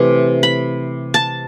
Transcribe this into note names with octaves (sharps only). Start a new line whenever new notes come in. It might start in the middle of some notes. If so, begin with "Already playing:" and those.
Already playing: C3 E3 A3
B5
A5